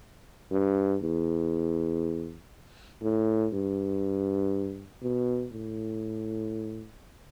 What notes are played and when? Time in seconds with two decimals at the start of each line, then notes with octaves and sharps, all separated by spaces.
0.51 G2
1.02 E2
3.02 A2
3.53 G2
5.03 B2
5.53 A2